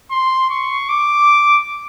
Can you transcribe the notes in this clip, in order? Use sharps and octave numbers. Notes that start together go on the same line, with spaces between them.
C6
C#6
D6